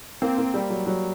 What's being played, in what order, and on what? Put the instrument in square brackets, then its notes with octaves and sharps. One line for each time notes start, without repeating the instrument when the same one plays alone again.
[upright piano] A#3 [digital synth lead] C4
[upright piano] A#3
G3
F#3
F#3